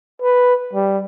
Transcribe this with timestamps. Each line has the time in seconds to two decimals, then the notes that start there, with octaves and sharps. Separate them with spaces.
0.22 B4
0.73 G3